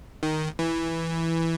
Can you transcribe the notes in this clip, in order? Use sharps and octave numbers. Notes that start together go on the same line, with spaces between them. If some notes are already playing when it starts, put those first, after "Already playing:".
D#3
E3